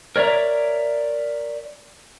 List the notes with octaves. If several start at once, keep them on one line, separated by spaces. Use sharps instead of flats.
A#4 C#5 D5 E5 A#5